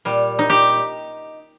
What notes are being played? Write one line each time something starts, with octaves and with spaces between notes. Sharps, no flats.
A#2 G3
D#4
G4